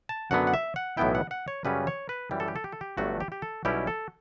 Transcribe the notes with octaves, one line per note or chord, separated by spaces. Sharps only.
A5
F#2 D3 F#3 B3 F#5
F#5
E5
F#5
B1 A2 E3 B3 E4 G5
F#5
F#5
C#5
F#2 C#3 G3 C#4 B4
C#5
B4
F#2 E3 G3 G4
A4
G4
A4
G4
A4
G4
G1 G2 F#3 A3 D4 F#4
G4
G4
A4
B1 B2 G3 C#4 E4 G4
A4